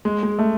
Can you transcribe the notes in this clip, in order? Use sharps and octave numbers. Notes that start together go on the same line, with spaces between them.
G#3
G#3
A3